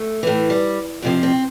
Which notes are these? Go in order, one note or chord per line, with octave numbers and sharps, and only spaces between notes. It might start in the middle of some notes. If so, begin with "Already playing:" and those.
Already playing: A3
A2 E3
G3
F2 C3 F3
C4